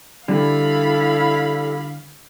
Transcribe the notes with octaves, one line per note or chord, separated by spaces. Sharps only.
D3 G3 E4 A4 F5 B5